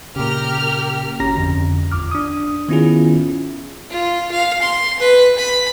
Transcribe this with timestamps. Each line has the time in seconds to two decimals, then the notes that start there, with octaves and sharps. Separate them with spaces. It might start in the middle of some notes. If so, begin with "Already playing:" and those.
0.16 A#2 C#3 G4 A#4 F6
1.20 G#1 C#4 G4 A#5 A#6
1.36 F2 D3
1.92 G1 E2 D6 F6
2.11 D4 D#6
2.68 D#3 B3 C#4 E4 F4 G#4
3.90 F4
4.31 F5
4.62 C6
5.00 B4
5.38 B5